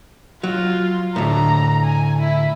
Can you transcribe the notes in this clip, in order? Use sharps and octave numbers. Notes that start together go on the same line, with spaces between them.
F#3 F4
D2 A2 A#5
G#5
E4